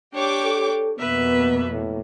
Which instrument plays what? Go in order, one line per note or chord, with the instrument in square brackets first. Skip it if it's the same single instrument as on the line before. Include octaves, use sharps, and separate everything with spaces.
[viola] D4 C#5 [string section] G4 G5 D6
[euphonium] A4
[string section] F2 B2 A#3 [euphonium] B3 [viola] B4 E5
[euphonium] A2